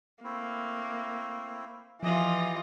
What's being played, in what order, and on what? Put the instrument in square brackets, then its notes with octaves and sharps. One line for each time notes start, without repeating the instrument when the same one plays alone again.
[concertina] A3 C4 E4 [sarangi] A#3
[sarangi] E3 [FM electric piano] F3 [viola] F4 D#5 [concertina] G4 G#4